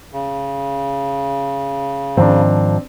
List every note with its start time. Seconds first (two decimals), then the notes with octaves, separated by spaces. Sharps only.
0.13 C#3
2.17 G#2 D#3 F3 C4 D4